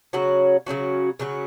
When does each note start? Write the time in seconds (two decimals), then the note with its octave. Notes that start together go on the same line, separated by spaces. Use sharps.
0.13 C#3 F#3 C#4 F#4
0.66 C#3 F#3 C#4 F#4
1.19 C#3 F#3 C#4 F#4